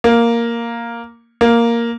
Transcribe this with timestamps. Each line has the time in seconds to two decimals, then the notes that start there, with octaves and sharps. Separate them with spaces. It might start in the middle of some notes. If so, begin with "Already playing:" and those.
0.04 A#3
1.41 A#3